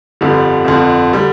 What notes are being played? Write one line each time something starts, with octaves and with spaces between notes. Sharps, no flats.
G1 F2 D3 G3
G1 F2 D3
D3 G3